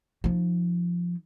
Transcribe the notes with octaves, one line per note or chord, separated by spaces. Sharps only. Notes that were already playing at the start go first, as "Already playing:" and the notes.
F3 D#4